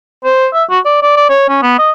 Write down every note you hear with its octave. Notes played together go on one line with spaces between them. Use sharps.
C5
E5
F#4
D5
D5
D5
C#5
C#4
B3
D#5